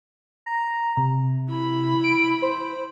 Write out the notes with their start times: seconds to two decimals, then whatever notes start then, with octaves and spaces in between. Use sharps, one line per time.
0.46 A#5
0.97 C3
1.49 E4 B5
2.04 D7
2.42 C5